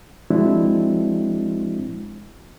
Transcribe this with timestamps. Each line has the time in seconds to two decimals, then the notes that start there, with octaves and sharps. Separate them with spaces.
0.30 F3 G#3 C4 D4 E4 F#4